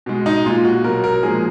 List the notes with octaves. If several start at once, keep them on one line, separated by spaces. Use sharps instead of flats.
B2 G#3
D#4
A#2 G#3 F4
F#4
B2 F#3 A#4
A#4
A#2 F3 G#3 G#4